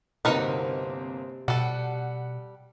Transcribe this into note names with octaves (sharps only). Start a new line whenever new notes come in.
G1 C3 A#3 C4 D#4 F#4 A#4 B4
B2 G3 A4 F#5